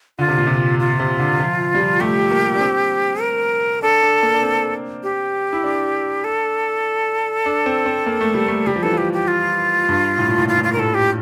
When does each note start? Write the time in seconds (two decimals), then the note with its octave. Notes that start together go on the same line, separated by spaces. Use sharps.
0.19 D3 F4
0.28 C3
0.38 A#2
0.47 C3
0.79 F4
0.99 C3
1.20 D3
1.40 F3
1.75 G3
1.80 F3
2.00 A3 G4
2.31 A#3
2.55 D4
2.61 C4
3.21 A#4
3.82 D4 A4
4.02 D4
4.23 A#3
4.34 D4
4.43 C4
5.03 G4
5.53 E4
5.64 D4
6.24 A4
7.46 D4
7.66 C4
7.86 C4
8.06 A#3
8.21 A3
8.34 G3
8.48 A3
8.67 G3 G4
8.76 F3
8.83 E3 A4
8.93 F3 G4
9.13 G4
9.28 F4
9.89 G2
10.18 A2
10.28 A#2
10.38 A2
10.48 A#2 F4
10.57 A2
10.64 A#2 F4
10.73 A#4
10.77 A2 A4
10.94 G4